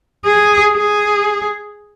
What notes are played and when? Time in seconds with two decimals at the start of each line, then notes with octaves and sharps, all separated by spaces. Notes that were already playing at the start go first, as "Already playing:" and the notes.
0.25 G#4
0.75 G#4